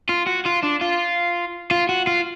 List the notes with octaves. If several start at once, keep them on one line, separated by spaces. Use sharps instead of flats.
F4
F#4
F4
D4
F4
F4
F#4
F4